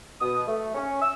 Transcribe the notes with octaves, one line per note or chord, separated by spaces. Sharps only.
B2 D#6
A3
C#4
E6